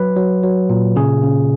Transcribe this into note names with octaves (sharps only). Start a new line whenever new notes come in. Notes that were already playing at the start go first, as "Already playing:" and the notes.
Already playing: F#3 B4
F#3
F#3
A#2
C#3 G#4
C#3